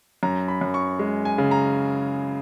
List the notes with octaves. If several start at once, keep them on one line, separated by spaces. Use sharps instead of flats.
F#2 A#5
B5
F#2
C#6
G#3
G#5
C#3
A#5